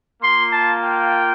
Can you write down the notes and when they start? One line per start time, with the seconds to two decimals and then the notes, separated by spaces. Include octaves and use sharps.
0.22 A#3 F4 C6
0.51 A5
0.81 G5